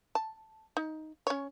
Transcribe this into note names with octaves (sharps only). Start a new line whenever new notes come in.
A5
D#4
C#4 C#5